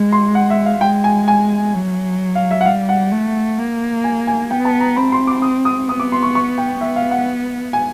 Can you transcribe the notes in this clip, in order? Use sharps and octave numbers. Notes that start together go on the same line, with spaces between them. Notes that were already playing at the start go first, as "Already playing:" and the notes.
Already playing: G#3
C6
F#5
E5
F5
G#3 G5
G#5
G#5
F#3
F5
E5
F#5
G3 F5
F#5
A3
A#3
G#5
G#5
B3 G5
A5
A#5
C4 B5
C6
D6
D#6
D#6
B3 D#6
D6
C6
C#6
C#6
G5
B3 E5
F5
F#5
G#5